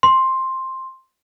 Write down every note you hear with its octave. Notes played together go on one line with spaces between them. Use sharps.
C6